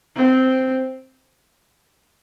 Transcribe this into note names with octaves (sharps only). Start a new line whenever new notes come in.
C4